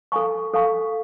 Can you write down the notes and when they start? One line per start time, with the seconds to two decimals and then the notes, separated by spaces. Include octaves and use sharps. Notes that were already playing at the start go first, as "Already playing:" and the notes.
0.12 A4 F5 G#5 C#6
0.53 A4 F5 G#5 C#6